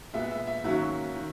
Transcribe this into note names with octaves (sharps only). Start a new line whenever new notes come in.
A#2 G#3 B3 E5
E5
E5
G#2 D#3 F#3 A#3 C#4 E5
D#3